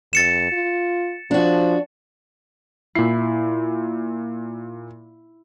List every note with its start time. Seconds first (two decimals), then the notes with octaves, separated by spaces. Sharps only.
0.13 F2 A6 C#7 E7
0.52 F4
1.31 F3 D4 F#4
2.95 A#2 E4 C7